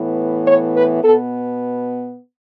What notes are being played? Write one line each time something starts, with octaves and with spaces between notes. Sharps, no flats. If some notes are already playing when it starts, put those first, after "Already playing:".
Already playing: A2 E3 B3
C#5
B4
B2 B3 A4